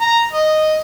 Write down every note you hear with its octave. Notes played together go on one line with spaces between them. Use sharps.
A#5
D#5